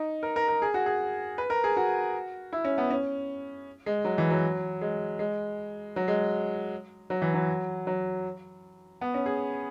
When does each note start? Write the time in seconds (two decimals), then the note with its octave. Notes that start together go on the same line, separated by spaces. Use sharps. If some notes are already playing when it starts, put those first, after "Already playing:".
Already playing: D#4
0.23 A#4
0.36 A#4
0.48 A#4
0.62 G#4
0.74 F#4
0.86 G#4
1.38 B4
1.50 A#4
1.64 G#4
1.77 F#4
2.53 E4
2.65 C#4
2.78 B3
2.90 C#4
3.86 G#3
4.05 F#3
4.18 E3
4.30 F#3
4.81 G#3
5.19 G#3
5.96 F#3
6.08 G#3
7.10 F#3
7.22 E3
7.34 F#3
7.87 F#3
9.01 B3
9.14 C#4
9.26 G#4